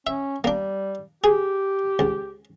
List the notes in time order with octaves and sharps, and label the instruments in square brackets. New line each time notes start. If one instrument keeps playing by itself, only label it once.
[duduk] C#4 [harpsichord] E5
[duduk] G3 [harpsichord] A#3 D4
[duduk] G4 [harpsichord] G#4
[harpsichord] C#2